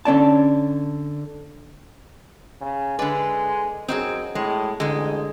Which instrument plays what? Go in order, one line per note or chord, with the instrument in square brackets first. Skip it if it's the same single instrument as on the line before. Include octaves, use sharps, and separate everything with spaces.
[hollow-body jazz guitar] D3 C#4 D5 A5
[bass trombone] C#3
[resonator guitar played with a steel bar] D3 B4 [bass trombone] G#3 [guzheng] D5
[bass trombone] F#2 [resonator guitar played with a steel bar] C4 [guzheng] D#4 F#4 G#4
[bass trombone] A2 [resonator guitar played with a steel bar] G#3
[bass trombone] A1 [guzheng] D3 D#4 [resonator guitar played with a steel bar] G#3